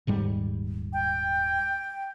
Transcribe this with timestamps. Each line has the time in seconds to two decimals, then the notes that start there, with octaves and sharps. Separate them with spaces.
0.07 D#1 G#2 G3
0.93 G5